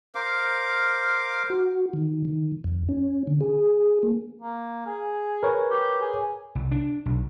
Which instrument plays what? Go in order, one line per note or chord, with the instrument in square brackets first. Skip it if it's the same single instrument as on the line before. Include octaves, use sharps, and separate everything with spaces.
[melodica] A#4 C5 F5 D6
[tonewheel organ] F#4
D#3
D#3
F2
C#4
D3
G#4
A#3
[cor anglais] A#3
G#4
[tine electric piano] A#4 B4 C#5
[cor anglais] G4
G#4
[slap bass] C2
D4
B1